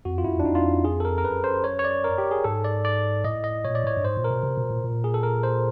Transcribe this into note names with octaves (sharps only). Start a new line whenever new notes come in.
F2 F#4
F4
F#2 E4
E2
D4
F2 D#4
F4
G#4
A4
A#4
A#4
F#2 B4
C5
C#5
C#5
D5
A#4
G4
G#4
G#2 A4
D5
D5
A2 D#5
D#5
A#2 C#5
D5
A2 C#5
G2
G#2 C5
A#2
A#4
B2
C3
B2
A#2
A#2
G#4
A4
A#4
C5